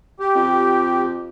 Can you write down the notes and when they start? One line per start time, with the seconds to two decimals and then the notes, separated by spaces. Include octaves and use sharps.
0.20 G4
0.35 F2